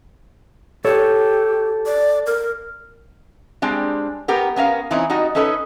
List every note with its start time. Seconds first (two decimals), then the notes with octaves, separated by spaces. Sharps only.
0.85 G4 A4 C#5
1.86 D5
2.26 A#4
3.62 G3 G#3 C4 D4
4.28 B3 G4 A#4 G5
4.56 B3 C#4 A#4 F5
4.91 E3 C4 C#4 D#4 E4
5.10 G3 D#4 F#4 D#5
5.35 C#4 D#4 A4 B4 C#5 D#5